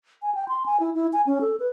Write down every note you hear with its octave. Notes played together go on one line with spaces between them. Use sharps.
G#5
G5
C6
G#5
E4
E4
G#5
C#4
A4
B4